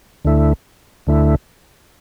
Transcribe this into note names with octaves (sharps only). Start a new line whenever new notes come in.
D2 D3 A3 E4
D2 D3 A3 E4